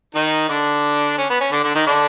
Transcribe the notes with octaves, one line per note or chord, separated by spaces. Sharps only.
D#3 D#4
D3 D4
C#4
B3
C#4
D3 D4
D3 D4
D#3 D#4
D3 D4